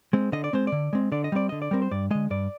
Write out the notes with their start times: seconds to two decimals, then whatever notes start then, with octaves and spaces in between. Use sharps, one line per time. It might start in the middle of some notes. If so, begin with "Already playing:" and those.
0.13 G#3 C4
0.32 D3 D#5
0.44 D5
0.53 G#3 C4 C5
0.67 D3 D5
0.93 G#3 C4
1.12 D3 D5
1.24 D#5
1.32 G3 C4 D5
1.49 D3 D#5
1.62 D5
1.71 G3 C4 A#4
1.82 C5
1.91 G2 D5
2.11 D3 G#3 D#5
2.30 G2 D5